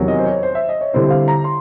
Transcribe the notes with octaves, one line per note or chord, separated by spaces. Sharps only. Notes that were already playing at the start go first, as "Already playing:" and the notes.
Already playing: E2 C3 D#3 F#3
D#5
C5
C#5
C5
E5
D#5
C#5
D3 G3 C4 E4 C5
F5
A#5
C6